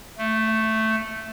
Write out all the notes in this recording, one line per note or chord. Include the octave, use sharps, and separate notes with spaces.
A3